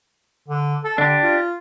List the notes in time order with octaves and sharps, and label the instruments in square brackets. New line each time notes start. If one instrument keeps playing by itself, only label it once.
[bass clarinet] D3
A4
[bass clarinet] D3 [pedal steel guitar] D4 G4
[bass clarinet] F4